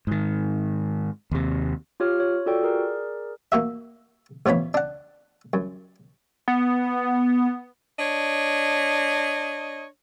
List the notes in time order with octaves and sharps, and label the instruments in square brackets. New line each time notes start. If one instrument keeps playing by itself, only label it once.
[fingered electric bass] G#2 D#3
D#2 C3
[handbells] F4 G4 C#5 F6
C#5
F4 F#4 A4 D5 G5
G#4 A#4 D5
[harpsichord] A#3 F#4 E5
A1 F3 B3 C#5 B5
D4 F#5
F#2
[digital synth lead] B3
[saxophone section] D4 C#5 D#5